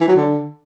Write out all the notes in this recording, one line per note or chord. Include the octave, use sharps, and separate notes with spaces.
E3
F#3
D3